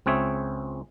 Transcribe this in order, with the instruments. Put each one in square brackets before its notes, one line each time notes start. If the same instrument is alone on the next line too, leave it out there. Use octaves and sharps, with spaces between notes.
[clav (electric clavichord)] C#2 C4 G#4 C#5 E5